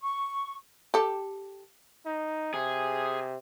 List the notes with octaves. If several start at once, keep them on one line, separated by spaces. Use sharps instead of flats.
C#6
G4 A4
D#4
C3 G#4